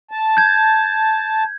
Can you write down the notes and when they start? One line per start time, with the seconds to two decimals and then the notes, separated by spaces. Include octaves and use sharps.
0.11 A5
0.37 G6 G#6